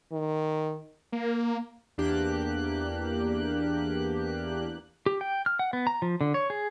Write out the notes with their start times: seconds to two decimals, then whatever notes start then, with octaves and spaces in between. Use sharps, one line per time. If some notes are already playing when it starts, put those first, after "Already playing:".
0.12 D#3
1.12 A#3
1.98 E2 A#3 D4 G4 F#6
5.06 G4
5.21 G5
5.46 F6
5.59 F#5
5.73 B3
5.87 A#5
6.02 F3
6.21 D3
6.34 C#5
6.50 G#4